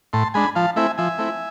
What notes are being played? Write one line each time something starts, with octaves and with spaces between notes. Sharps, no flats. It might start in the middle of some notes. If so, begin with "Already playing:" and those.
A2 A5 C6
G#3 D4 G#5 B5
F3 F5 A5
A3 C4 E4 E5 G#5
F3 E5 G#5
A3 C4 E4